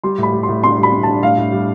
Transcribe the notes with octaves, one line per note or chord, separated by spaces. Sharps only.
G3 C6
A2 B5
G3
C6
A2
D4 C6
G3
B5
D4
D4 A5
A2 F5
A2
G3